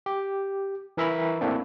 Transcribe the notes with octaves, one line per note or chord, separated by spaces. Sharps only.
G4
E3 A#4 E5 A#5 B5
A3 A#3 C4 D4 E4